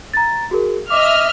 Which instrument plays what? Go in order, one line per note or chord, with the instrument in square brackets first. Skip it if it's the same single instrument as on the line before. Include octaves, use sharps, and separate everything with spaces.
[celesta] A#5 A6
F#4 G#4 A#4
[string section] D#5 E5 F6 [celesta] D6